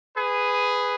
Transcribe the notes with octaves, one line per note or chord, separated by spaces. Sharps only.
G#4 B4